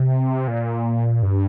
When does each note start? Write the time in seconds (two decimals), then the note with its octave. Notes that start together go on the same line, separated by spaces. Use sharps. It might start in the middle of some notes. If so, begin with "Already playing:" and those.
Already playing: C3
0.48 A#2
1.22 G2